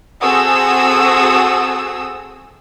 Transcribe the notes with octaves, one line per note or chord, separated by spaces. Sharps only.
C4 F#4 G#4 A4 D#6 E6